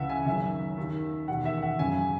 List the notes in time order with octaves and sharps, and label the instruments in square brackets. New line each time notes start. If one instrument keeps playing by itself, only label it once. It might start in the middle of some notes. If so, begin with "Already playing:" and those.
Already playing: [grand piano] C#2 C#3 E3 E5 F#5
G#5
F#1 F#2 D#3 E5
D#2 D#3
E1 D#2 D#3 F#5
E5
F#5
F#1 F#2 C#3 G#5